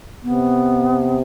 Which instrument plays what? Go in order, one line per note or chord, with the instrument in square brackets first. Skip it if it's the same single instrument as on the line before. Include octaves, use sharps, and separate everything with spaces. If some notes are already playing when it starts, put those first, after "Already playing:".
[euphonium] C3 [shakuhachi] B3